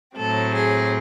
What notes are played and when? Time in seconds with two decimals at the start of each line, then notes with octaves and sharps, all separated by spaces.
0.16 A2 F#3 C4 A4
0.53 G#4